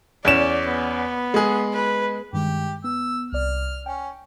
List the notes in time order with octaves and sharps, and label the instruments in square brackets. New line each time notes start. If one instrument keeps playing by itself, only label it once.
[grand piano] E2 C#4 E7 [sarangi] D5
[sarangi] B3
[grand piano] G#3 G#4
[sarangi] B4
[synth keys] G2 D#3 G#3 [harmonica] G4
[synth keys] B3 [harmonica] E6
[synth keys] C2 D5 [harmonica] F6
[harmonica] C#4 [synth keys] G5